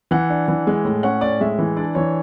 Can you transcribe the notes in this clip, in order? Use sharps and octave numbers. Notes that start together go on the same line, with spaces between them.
E3 F#5
D4
E3
G#3
A2
C#4 F#5
A2 D5
G#3 E5
E3
D4 D5
E3 C#5